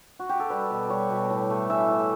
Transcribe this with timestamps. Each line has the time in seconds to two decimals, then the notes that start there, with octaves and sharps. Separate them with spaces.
0.19 F#4
0.29 G4
0.40 A4
0.50 G3 B4
0.71 B2
0.90 G3 C#5
1.10 B2
1.30 A2
1.50 A3
1.70 E3 E5
1.90 A2